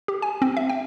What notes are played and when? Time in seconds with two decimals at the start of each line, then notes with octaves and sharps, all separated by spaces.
0.08 G4
0.22 G#5
0.42 C4
0.57 E5
0.70 G5